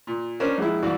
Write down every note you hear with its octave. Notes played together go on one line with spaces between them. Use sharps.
A#2
C#4 D4 A#4 C5
A#1 G#3 E4
C2 E3 F#4 D5 F5